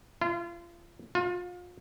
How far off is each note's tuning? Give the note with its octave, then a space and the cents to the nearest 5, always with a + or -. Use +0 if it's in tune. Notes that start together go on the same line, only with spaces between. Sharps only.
F4 -35
F4 +30